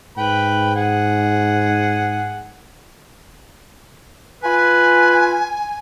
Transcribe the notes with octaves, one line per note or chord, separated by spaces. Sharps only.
G#2 B4 G5 B5
G#4 F#5
F4 B4 G#5